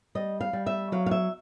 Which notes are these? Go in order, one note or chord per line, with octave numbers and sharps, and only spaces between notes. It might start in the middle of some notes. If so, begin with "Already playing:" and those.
G3 D#5
F5
G3
E5
F#3 F5
F5
E5